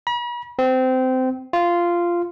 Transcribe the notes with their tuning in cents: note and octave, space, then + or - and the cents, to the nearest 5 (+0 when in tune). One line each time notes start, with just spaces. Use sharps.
B5 -45
C4 -20
F4 -10